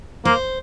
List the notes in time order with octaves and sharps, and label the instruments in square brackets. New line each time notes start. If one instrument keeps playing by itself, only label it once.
[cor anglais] A#3 [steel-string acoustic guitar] C5